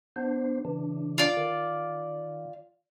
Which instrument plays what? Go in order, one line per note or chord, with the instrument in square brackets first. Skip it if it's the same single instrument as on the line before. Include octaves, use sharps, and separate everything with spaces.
[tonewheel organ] B3 D4 C5
C#3 E3 D4
[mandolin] F4 D5
[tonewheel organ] D#3